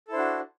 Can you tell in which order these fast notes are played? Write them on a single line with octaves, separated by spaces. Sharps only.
A4 E4 C5 D4 F#4